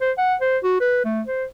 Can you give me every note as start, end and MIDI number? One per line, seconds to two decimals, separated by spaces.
0.01 0.12 72
0.18 0.35 78
0.41 0.58 72
0.64 0.79 66
0.80 1.03 71
1.05 1.22 57
1.27 1.45 72